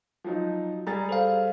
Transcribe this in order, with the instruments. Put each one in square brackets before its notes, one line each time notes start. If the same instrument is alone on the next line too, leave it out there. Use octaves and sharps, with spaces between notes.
[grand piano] F3 F#3 D#4
[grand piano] G3 G#4 A6 [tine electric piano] A#5
[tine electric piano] A4 C5 F5